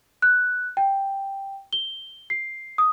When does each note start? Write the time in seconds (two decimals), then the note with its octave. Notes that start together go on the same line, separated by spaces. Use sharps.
0.22 F#6
0.77 G5
1.73 G7
2.30 C7
2.78 D#6